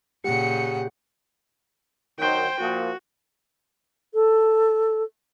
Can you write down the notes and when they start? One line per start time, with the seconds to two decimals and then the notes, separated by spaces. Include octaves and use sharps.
0.24 A#2 C#3 G4 F#5 C#7
2.19 D#3 F#3 C5 G5
2.60 A#2 F3 F#4
4.14 A4